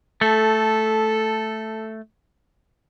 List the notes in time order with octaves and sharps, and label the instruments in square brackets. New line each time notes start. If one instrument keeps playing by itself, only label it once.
[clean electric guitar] A3 [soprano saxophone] A4